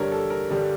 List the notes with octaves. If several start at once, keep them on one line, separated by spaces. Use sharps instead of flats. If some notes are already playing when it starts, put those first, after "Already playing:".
Already playing: G2 D3 G3 A#4 C#5
A4
A#4
G2 D3 G3